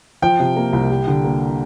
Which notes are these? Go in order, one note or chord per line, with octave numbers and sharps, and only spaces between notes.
F3 G5
C3
A#3
C2
G3
D3
A#3